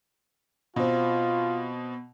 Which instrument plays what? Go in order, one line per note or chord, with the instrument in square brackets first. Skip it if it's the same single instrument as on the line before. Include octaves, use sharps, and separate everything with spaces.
[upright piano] B2 C4 [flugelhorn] F4